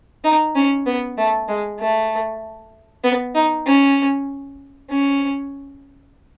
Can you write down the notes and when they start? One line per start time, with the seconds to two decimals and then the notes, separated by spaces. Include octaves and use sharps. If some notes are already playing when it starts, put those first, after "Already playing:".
0.24 D#4
0.55 C#4
0.86 B3
1.17 A3
1.48 G#3
1.79 A3
3.04 B3
3.35 D#4
3.66 C#4
4.90 C#4